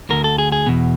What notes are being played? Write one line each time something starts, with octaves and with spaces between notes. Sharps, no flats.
D2 D3 A#4
A4
G#4
G#4
E2 B2